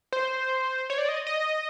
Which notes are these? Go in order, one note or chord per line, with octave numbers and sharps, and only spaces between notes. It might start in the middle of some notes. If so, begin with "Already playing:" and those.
C5
C#5
D5
D#5
D#5